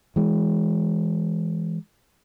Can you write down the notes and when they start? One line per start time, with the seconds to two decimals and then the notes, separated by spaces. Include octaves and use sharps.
0.16 E3 G#3